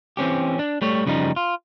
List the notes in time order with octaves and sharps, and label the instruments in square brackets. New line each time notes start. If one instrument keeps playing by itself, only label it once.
[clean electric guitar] E3 C4 C#4 G4
D4
G3 A3 C#5
F#2 C#3 F3 G3 C4 D#4
F4